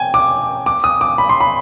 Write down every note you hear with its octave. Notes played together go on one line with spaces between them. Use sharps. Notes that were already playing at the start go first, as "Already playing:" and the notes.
Already playing: G5 G#5
D6
D6
D#6
D6
B5
C6
B5